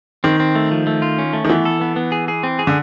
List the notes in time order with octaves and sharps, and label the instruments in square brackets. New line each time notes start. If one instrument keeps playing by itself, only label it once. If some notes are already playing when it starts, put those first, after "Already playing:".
[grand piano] D#3 [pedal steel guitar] C4
[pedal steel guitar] C4
A3
F3
A3
F4
C#4
A3
[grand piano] D#3
[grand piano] E3 [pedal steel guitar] B3
[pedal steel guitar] A4
B3
B3
G#4
G#4
C4
G#4
[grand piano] D3